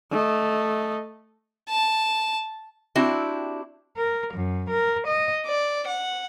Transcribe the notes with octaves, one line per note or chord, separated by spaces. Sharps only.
A3 D#5
A5
C4 D4 E4 F#4 G4
A#4
F#2
A#4
D#5
D5
F#5